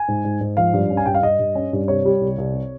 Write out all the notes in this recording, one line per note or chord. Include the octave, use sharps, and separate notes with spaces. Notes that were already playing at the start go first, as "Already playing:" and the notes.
Already playing: G#5
G#2
G#2
G#2
F3 F5
G2
C#4
G#5
G2 G5
F5
G2 D#5
G2
C#4
G2
C3 C#5
G3
C2
C2
C3